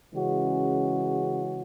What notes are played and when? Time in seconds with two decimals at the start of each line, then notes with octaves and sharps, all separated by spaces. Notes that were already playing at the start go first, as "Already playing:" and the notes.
0.12 C#3 E3 G#3 C#4 F#4